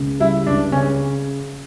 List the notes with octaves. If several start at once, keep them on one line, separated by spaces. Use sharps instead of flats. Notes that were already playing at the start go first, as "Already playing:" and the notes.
Already playing: C#2 C#3
G3 E4
C#2 D4
C#3 C#4